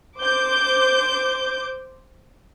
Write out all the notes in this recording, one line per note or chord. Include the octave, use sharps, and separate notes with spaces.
C5 D6 G6